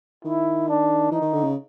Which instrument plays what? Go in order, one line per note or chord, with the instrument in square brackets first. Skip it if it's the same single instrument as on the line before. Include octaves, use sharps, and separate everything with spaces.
[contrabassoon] D#3 [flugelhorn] E4
[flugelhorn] D4
[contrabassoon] E3 [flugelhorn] D#4
[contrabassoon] D#3
D3
C#3